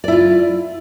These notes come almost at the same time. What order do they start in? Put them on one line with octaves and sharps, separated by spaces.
D5 E4 F4